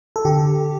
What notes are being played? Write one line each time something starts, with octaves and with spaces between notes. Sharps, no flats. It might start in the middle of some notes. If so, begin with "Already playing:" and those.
A4
D3 G4